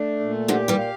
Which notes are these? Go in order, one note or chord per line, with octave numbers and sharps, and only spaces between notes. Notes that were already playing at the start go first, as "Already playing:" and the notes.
Already playing: A3 D4
A#2
D3 F3 G4
E3 G3
F5